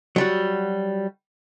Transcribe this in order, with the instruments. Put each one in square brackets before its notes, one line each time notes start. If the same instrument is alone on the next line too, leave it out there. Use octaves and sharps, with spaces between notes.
[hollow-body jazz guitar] F#3 G3 F#4